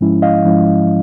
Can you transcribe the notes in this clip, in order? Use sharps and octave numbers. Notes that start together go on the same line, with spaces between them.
G#2 F3 G#3 C#4 E4
D#5 F5
G#2 F3 G#3 C#4 E4